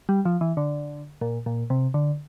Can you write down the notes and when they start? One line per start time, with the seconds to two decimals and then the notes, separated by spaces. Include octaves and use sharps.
0.09 G3
0.25 F3
0.41 E3
0.57 D3
1.21 A#2
1.46 A#2
1.70 C3
1.94 D3